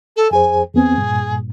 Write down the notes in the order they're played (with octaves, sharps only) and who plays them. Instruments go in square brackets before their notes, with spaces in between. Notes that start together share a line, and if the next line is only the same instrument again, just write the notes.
[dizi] A4
[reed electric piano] F2 G#4 C5 [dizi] G#5
[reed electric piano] E2 B3 C4 [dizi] G#4
[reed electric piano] G2 A#2